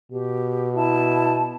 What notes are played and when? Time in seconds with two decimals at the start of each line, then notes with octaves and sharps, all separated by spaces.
0.12 B2 G4
0.76 E4 A5